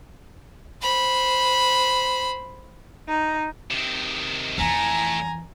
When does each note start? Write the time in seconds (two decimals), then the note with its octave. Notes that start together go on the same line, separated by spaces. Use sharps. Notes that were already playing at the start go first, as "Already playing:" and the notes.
0.82 C5 B5
3.07 D#4
3.70 C3 D#3
4.58 F2 A2 E3 A3 G#5 A#5